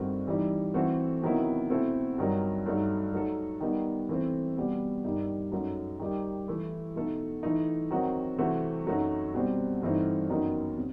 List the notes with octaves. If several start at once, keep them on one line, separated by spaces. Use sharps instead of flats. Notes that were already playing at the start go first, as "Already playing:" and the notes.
Already playing: G2 D#3 A3 C4 F#4
E3 G3 D#4
E3 A3 C4 F#4 A4
C3 D#3 F#3 B3 E4
B2 A3 C4 E4 A4
G2 D#3 F#3
G2 F#3 A3 D#4
F#3 A3 D#4 A4
D#3 G3 B3 D#4
E3 A3 C4
B2 G3 B3
G2 D#3 G3 D#4
F#2 F#3 A3 D#4
D#3 G3 D#4 G4
E3 A3 E4
B2 A3 D#4 A4
E3 A3 D#4
D#3 F#3 C4 F#4
C3 E3 A3 C4 F#4
F#2 F#3 A3 D#4 F#4
B2 G3 C4
G2 E3 A3 C4 D#4
F#2 D#3 F#3 B3 D#4
C3